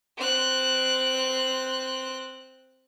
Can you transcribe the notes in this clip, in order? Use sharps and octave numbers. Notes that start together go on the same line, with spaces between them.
C4 F#6